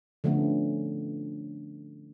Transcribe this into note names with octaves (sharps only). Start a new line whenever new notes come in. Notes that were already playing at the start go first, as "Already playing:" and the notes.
D3 F3 A3 B3 C#4